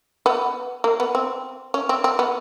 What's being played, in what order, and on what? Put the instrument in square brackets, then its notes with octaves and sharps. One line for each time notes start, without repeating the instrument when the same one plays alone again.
[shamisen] B3
A#3
B3
C4
C#4
C4
C4
B3